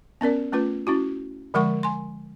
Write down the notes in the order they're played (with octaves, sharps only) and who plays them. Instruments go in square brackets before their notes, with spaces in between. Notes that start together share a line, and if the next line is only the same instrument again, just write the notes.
[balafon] B3 C#4 A#4 D5
A3 C#4 F4 B4
C#4 E4 F#4
D3 F3 G#3 A#4 F#5 C#6
G#5 C6